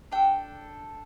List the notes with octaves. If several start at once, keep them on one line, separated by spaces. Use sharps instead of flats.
D4 A4 G5